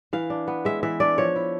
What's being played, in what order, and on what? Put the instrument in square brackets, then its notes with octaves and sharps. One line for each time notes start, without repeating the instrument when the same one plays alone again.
[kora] E3 F5
D4
B3
G#3 E5
E3 E5
D4 D5
F3 C#5
E4